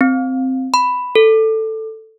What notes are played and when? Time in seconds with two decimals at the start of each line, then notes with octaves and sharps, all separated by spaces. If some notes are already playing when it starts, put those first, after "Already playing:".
0.01 C4
0.74 B5
1.15 A4